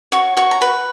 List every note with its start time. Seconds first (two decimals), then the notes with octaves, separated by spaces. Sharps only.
0.12 F#4 C#5 C#6
0.37 F#4 C#5 C#6
0.51 A#5
0.61 F#4 B4 B5